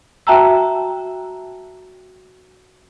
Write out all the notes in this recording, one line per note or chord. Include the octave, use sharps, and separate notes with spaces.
F#4 E5 G5 A5 A#5 E6